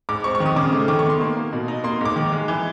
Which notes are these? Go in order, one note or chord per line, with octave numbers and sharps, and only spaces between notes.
G#2 D6
C4 C#6
C#6
D#3
D#6
C#3 D6
A3
D#3 D6
C#6
B3
C6
A#3
A#3
B2
D#4
A#3 C6
G#2 D6
D#3
G#3
E3